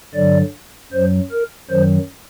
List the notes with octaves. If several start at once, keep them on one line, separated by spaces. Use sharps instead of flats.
G2 D3 F#3 D5
F#2 F#3 C5
A#4
F#2 D#3 F#3 C5